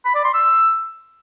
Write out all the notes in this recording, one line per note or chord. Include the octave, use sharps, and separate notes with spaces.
B5
D5
C6
E6